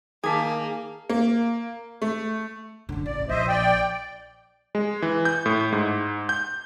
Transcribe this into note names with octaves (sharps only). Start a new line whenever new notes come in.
D#3 A#3 G#4 G#5 A5 D6 B6
A#3
A3
F#1 D3
A1 D5
A#1 C5 D#5 E5
D5 G5
G#3
E3
G6
A2
G#2
G6